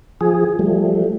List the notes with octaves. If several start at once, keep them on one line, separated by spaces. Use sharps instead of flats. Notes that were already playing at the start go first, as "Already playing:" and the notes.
F3 G#4
F3 G3 A3